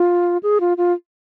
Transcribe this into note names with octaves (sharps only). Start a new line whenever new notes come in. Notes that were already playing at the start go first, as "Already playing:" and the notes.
Already playing: F4
G#4
F4
F4